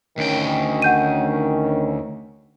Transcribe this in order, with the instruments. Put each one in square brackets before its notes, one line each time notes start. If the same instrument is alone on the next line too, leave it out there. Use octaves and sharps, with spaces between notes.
[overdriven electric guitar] D2 G5 [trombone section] D#3 C#4
[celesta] F#5 G6 D#7